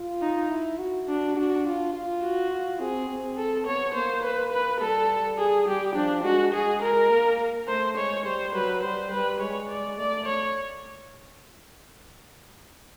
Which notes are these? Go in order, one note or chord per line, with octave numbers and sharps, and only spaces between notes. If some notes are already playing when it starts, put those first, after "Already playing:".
Already playing: F4
D#4
E4
F#4
D4
D4 F#4
F4
F4
F#4
F4
C4 G#4
C4
A4
B3 C#5
A#3 C5
B4
B4
G3 A4
G#4
G3 G4
F3 D4
G#3 F#4
G#3 G#4
A#4
A#3
A3 C5
G#3 C#5
G3 C5
F#3 B4
G3 C5
G3 B4
G#3 C#5
D5
A3 D5
C#5